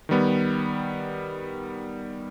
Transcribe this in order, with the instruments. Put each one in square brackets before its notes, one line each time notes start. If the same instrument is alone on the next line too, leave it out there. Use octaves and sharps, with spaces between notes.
[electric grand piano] D#3 G3 B3